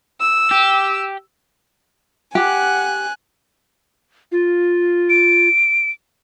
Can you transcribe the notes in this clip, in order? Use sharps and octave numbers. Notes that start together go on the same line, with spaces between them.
E6
G4
G4 F#5 G#5 F#6
F4
D7